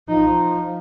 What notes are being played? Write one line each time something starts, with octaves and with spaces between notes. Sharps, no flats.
F3 D#4